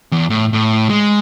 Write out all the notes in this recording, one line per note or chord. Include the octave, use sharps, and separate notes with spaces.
E2
A2
A2
G#3